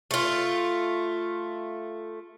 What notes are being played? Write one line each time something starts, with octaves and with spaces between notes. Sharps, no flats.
A3 F4